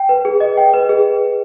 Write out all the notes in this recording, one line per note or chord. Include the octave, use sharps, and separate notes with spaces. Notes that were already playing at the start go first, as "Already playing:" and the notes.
Already playing: G5
B4
G#4
D#5
G5
B4
G#4